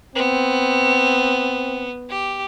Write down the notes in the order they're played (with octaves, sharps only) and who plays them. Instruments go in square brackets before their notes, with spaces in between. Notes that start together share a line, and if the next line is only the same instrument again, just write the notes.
[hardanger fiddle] B3 [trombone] C4
[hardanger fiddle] G4